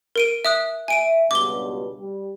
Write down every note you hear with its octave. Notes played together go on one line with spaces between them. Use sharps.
A#4 D7 D#7
E5 D#6 F#6
E5 G#5 D7 D#7
C#2 G2 B2 D6 G7
G3